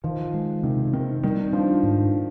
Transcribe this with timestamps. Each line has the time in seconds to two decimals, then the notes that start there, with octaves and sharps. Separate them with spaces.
0.04 D#3 F3
0.34 G#3
0.63 C3 D#3
0.93 D#3 C4
1.23 D#3 G3
1.53 F3 D4
1.83 G#2